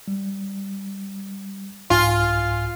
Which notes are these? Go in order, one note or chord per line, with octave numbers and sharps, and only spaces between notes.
G3
C2 G#2 F4 G#5